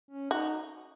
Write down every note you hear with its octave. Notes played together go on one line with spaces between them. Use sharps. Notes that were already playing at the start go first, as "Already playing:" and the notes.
C#4
D#4 F#4